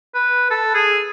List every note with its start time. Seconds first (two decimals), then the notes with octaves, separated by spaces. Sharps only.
0.14 B4
0.50 A4
0.75 G#4